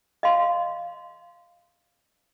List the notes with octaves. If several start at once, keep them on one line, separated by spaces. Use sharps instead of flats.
D#5 F5 C6